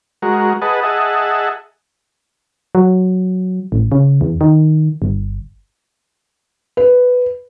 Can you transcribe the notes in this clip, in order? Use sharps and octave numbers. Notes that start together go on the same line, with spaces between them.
G#3 F#4 A#4
G#4 B4 D#5 F#5 A5
G#4 D#5 E5 F#5 A5
F#3
A1
C#3
E2
D#3
G1
B4